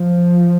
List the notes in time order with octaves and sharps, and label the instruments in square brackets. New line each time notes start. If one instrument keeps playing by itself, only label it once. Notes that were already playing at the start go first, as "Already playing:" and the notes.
Already playing: [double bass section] F3